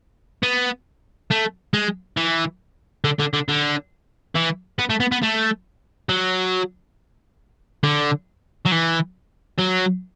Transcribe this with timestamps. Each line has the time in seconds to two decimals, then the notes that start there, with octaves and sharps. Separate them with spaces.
0.43 B3
1.31 A3
1.73 G#3
2.17 E3
3.05 D3
3.20 D3
3.34 D3
3.49 D3
4.35 E3
4.79 B3
4.90 A3
5.00 B3
5.12 B3
5.23 A3
6.09 F#3
7.84 D3
8.65 F#3
8.71 E3
9.58 F#3